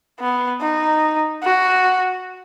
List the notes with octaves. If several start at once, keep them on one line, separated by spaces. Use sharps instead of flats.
B3
D#4
F#4